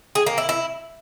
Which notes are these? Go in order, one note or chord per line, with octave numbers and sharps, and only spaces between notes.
G#4
A#3
E4
E4